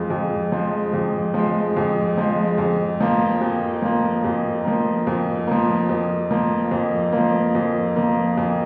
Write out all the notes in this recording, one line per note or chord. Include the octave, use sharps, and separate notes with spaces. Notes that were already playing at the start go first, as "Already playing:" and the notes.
Already playing: F2 F3 G#3
F2
F3 G#3
F2
F3 G#3
F2
F3 G#3
F2
F3 A#3
F2
F3 A#3
F2
F3 A#3
F2
F3 A#3
F2
F3 A#3
F2
F3 A#3
F2
F3 A#3
F2